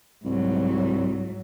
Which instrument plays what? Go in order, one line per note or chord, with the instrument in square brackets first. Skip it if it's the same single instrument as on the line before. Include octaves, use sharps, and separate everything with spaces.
[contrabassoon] C2 [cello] G#2 F#3